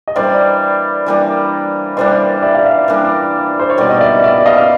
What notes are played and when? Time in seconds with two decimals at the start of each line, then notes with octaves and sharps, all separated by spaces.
0.08 D#5
0.16 E3 G3 A#3 D4 C5 D5
1.06 E3 G3 A#3 D4
1.97 E3 G3 A#3 D4 C5 D5
2.42 D5 E5
2.55 F5
2.65 D5 E5
2.88 E3 G3 A#3 D4
3.59 C5
3.70 C#5
3.78 B2 G3 A#3 D#4 D5
3.90 D#5
4.01 D5 E5
4.24 D5 E5
4.46 D#5 F5